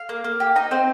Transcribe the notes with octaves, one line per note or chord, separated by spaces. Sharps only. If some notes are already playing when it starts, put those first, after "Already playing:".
Already playing: F5
A#3
A#3
G4
D#4 D#5
C4 C5